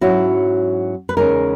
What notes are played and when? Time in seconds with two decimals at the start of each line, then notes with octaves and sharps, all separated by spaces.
0.01 G#2 F#3 C#4 E4 F#4
1.09 B4
1.17 E2 C#3 G#3 D#4 A#4